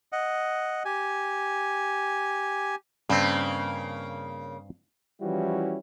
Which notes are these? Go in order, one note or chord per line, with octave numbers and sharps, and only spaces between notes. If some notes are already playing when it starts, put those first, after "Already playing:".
D#5 F#5
G4 G#5
G2 C#3 A#3 C4
E3 F3 G3 C#4 E4 F#4